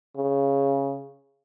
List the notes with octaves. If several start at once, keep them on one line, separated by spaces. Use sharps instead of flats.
C#3